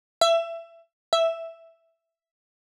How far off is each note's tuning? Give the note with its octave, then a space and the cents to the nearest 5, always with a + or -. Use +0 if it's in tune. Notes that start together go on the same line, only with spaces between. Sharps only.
E5 +25
E5 +5